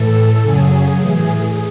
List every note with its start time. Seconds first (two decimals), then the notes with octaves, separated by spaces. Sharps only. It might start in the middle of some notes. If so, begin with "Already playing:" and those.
Already playing: A2 E3 A4
0.41 F#2 C#3 F#3 G#4
0.97 A2 E3